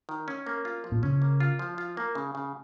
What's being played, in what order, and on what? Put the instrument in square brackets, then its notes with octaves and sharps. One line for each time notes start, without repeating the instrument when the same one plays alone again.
[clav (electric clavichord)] D#3
C#4
A#3
F4
F3
[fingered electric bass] A#2
[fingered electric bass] C#3 [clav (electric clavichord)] C#4
[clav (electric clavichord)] A#3
F4
F3
F4
A#3
C#3
C#3